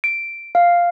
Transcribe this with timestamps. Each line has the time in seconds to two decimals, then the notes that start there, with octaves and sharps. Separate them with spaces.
0.04 D7
0.55 F5